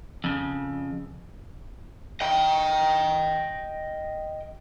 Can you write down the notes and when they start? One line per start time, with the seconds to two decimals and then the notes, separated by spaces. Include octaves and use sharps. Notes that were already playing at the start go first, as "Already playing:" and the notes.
0.24 F2 C#3
2.21 D#5 G5